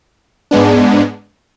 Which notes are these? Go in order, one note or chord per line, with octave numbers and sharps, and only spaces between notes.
G#2 G#3 B3 D4